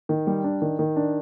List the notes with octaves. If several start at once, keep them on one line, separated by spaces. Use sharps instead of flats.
D#3
G3
D4
D#3
D#3
D4